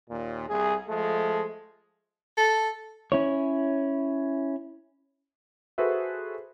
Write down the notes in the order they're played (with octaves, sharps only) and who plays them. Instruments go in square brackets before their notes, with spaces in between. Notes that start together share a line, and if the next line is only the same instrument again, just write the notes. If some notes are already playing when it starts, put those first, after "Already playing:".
[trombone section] D#2 A#2
C2 G#4
F3 G#3 A3 A4
[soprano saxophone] A4
[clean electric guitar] C#4 E4 C#5
[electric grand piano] F#4 G#4 A4 B4 C5 E5